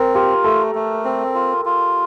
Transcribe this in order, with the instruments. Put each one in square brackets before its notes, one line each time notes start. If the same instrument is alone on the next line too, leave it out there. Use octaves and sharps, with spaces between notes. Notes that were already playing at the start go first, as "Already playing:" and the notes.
Already playing: [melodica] C4 [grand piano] A#4
[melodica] F4 [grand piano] G4
[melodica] A3 [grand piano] A4
[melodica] A3
C4
F4
F4